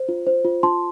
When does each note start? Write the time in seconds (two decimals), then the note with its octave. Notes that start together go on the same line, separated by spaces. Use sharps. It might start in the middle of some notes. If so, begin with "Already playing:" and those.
Already playing: C5
0.09 F4
0.27 C5
0.45 F4
0.63 F4 A5 C6